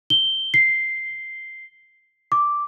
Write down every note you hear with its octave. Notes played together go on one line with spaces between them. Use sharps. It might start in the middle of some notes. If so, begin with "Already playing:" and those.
G7
C7
D6